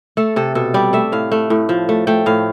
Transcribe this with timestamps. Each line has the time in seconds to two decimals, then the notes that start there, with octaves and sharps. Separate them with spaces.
0.17 A3 A4
0.36 C3 A4
0.55 B2 A4
0.74 G3 D5
0.93 A3 E5
1.12 A2 F5
1.32 A3
1.50 A2
1.69 F3
1.89 A3
2.07 A3 G5
2.26 A2 F5